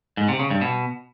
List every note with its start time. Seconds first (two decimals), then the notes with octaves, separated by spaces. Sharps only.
0.17 G#2
0.28 C3
0.39 C#3
0.50 G2
0.61 B2